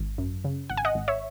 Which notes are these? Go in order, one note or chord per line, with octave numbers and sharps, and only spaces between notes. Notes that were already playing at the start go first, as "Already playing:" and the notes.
Already playing: G#1
F#2
C#3
G#1 F#5
G#5
D#5 F#5
G#1
C#5 E5